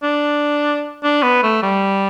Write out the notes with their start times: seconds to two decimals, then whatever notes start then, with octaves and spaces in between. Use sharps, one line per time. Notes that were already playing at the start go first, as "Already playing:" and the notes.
0.03 D4
1.03 D4
1.23 B3
1.43 A3
1.62 G3